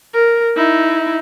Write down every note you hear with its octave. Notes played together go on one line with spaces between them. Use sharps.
A#4
D#4 E4